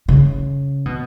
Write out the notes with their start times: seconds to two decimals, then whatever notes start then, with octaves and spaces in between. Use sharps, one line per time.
0.09 C#3
0.86 B2